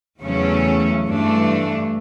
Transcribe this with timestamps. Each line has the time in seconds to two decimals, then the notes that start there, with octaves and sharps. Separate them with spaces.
0.20 E2 C#3 F#3 A3 C#4
1.06 G2 E3 A3 D4